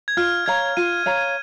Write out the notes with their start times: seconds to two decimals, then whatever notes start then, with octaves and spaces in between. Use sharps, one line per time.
0.08 G#6
0.17 F4 F6
0.46 C#5 F5 A#5 G#6
0.77 F4 D#7
1.06 C#5 F5 A#5